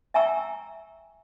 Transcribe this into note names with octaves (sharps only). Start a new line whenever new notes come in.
E5 G5 G#5 A#5 C#6 E6